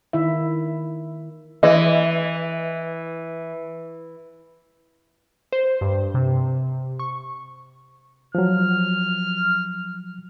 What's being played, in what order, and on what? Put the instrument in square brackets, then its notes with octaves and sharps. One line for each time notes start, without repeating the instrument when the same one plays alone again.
[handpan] D#3 E4 E5
[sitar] E3 [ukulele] D#5
[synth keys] C5
G2
C3
C#6
[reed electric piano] F3 F#3 [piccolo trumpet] F6